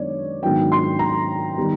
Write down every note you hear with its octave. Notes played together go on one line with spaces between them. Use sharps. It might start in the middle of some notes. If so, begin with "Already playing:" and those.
Already playing: F#2 D#3 G#3 B3 D4 C#5 D5
G#2 D#3 F#3 B3 D4 G5
C6
A#5
D#3 G3 B3